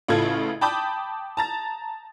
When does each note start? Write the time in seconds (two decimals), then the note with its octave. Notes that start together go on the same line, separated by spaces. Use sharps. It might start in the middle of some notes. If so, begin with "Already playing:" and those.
0.08 A1 A2 C#3 F4 A4 G#6
0.61 G5 A5 B5 D6 D#6 G6
1.37 A5 A#5 A6